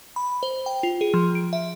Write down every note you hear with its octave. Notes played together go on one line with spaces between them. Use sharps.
B5
C5
G5
F4
G#4
F3
D7
E5